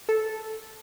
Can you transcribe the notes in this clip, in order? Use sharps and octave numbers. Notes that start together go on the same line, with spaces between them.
A4